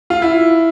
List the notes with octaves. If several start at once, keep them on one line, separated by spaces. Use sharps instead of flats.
F4
E4